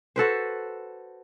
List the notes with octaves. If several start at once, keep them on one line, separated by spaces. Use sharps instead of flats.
F#4 A4 B4 C5